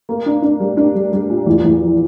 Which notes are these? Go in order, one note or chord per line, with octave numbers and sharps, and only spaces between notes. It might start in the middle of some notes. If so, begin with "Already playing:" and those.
A#3
D4
D4
G3
D4
G3
G3
A#2
E2
E2
F3